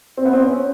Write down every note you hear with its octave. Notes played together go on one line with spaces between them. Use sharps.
C4
B3
C4
C#4